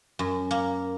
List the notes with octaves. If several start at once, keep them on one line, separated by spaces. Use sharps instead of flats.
F#2
A#3